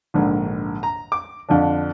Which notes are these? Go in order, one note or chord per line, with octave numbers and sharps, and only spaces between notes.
A#1 G#2 D3
A#5
D6
F2 D3 D4